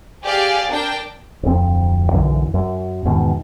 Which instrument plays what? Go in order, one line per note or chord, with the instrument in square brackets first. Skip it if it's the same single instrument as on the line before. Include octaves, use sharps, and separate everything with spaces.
[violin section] G4 G#4 D5 F5
D4 A#4 G5
[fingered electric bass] D1 F2 C4
B1 F#2 D3 E3
F#2
E2 G#2 B2 D#3